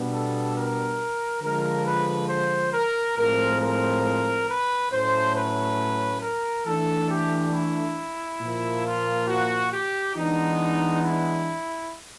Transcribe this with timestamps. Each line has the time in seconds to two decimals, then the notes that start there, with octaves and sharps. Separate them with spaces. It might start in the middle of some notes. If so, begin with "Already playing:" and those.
Already playing: B2 G3 B3 D4
0.12 A4
0.55 A#4
1.41 D3 F3 G#3 A#4
1.86 B4
2.29 C5
2.73 A#4
3.17 A2 F3 G#3 C4 A#4
3.60 A#4
4.48 B4
4.91 A2 F#3 A3 C#4 C5
5.35 B4
6.22 A#4
6.66 E3 A3 D4 A4
7.10 G4
7.53 E4
8.41 A#2 F3 A#3
8.85 F4
9.28 F#4
9.72 G4
10.15 E3 G#3 B3 D4 D#4
11.03 E4